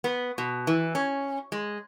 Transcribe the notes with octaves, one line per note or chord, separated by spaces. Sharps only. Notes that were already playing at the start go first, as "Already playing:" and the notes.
B3
B2
E3
C#4
G#3